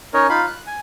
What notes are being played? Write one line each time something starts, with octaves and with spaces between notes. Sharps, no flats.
C#4 D#4 A#4 C#5 D#5
D#4 F4 F5 B5
F#6
G#5